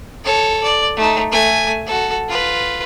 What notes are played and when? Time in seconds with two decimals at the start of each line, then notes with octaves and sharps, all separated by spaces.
0.24 A4 C#5
0.63 D5
0.97 A3 D#4
1.32 A3 G#5
1.86 F#4 A4
2.29 F4 B4